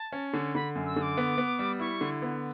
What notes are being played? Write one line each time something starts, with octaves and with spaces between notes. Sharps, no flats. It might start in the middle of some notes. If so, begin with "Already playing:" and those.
Already playing: A5
C#4
D3
D3 B5
F#2
E6
D3
D6
B3
B3
G3
E4 C#6
D3
B3